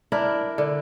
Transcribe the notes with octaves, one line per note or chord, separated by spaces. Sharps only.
D4 E4 A#4
D3